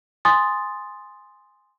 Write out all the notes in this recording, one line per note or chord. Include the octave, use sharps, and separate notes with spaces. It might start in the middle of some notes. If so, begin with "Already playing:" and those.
G#5 C6 D#6 A6